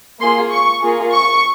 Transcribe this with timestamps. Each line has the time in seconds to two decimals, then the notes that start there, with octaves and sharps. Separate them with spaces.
0.20 A#3 F4 G#4 C6
0.51 C#6
0.82 A#3 F4 G#4
1.12 C#6